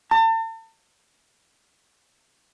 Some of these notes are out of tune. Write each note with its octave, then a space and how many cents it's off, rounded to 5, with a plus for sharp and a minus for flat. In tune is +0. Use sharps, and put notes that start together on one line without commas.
A5 +40